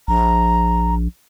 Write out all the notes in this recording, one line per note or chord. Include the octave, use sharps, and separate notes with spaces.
A#1 A#5